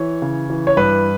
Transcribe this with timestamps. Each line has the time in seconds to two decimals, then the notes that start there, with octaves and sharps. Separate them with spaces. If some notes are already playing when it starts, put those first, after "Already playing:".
Already playing: E3 C#5
0.22 C#3
0.50 E3
0.67 C#5
0.77 G2 B4